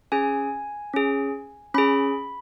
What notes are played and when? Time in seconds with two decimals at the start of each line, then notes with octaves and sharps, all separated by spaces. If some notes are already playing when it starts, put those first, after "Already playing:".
0.12 C#4 G#4 G#5
0.93 C#4 G#4
1.74 C#4 G#4 B5